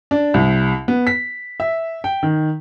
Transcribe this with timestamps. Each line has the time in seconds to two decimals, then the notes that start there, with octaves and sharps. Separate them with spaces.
0.11 D4
0.34 C2
0.88 B3
1.07 B6
1.60 E5
2.04 G5
2.23 D#3